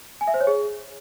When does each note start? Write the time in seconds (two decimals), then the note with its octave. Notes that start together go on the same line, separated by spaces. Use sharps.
0.21 G#5
0.27 E5
0.34 C5
0.41 C#5
0.47 G#4